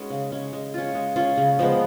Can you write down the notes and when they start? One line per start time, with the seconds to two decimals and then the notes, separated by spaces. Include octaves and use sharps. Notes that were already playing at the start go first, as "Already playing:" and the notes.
Already playing: G#3 C#4 D#4 F#4 B4
0.10 C#3
0.32 G#3 C#4
0.53 G#3
0.74 C#4 F4
0.95 G#3
1.16 C#4 F4
1.38 C#3
1.59 F3 G#3 B3